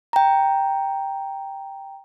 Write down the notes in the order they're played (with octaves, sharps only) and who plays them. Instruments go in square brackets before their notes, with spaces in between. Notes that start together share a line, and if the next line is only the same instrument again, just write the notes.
[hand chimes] G5 A#5